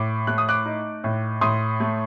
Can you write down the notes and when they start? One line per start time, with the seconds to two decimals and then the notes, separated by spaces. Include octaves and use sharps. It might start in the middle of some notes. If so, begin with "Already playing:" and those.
Already playing: A2 D6
0.27 A3 F#6
0.38 D#6
0.49 D6 F#6
0.66 D#4
1.04 A2
1.41 A2 C6 D#6
1.80 A3